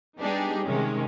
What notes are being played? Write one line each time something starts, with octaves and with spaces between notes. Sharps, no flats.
G3 B3 D4 D#4 G4 G#4
C3 D#3 G#3 C#4